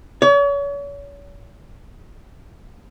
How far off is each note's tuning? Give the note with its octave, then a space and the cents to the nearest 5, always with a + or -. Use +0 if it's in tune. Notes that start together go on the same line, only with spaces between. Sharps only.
C#5 +40